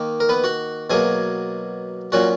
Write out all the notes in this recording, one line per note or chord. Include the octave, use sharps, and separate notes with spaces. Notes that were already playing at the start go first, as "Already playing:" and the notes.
Already playing: D#3 A#3 D#4
A#4
B3 B4
F#4 F#5
B2 F#3 A#3 G#4 G#5
A#2 F#3 C#4 F#4 F#5